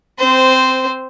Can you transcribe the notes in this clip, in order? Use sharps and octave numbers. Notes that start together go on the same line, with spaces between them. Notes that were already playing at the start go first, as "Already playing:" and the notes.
C4 C5